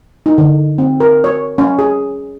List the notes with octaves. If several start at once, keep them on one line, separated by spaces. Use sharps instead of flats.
D#4
D3
C4
A#4
C#5
C#4
G#4